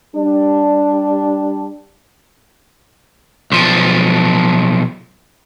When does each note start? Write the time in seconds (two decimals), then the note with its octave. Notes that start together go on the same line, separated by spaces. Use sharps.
0.15 G3 D4
3.52 B1 F3